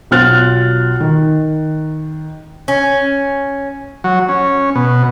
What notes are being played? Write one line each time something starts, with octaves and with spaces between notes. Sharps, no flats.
B1 F4 F6 F#6 A6
D#3
C#4
F#3
C#4
B2